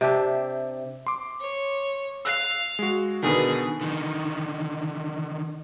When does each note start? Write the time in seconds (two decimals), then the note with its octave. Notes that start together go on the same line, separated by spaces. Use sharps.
0.01 C3 D4 G4 E5
1.06 C6 D6
1.40 C#5
2.25 F5 E6 F#6 C7
2.79 G#3 F#4
3.23 B2 D3 D#3 G#4 B4
3.81 D3 D#3